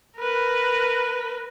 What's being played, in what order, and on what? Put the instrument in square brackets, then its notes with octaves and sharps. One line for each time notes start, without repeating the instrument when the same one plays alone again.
[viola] A#4 B4